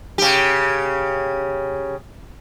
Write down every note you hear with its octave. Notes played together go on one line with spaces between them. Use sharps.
C#3 G4